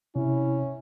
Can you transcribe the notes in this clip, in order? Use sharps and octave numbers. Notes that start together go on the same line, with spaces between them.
C3 C#4 E4